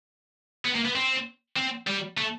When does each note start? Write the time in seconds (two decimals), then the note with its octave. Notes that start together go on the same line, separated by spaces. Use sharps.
0.66 B3
0.76 A#3
0.86 B3
0.96 C4
1.56 C4
1.87 G3
2.17 A3